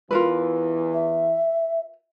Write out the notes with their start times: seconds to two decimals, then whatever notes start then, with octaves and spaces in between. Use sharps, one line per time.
0.11 E2 E3 F4 A#4 B4
0.94 E5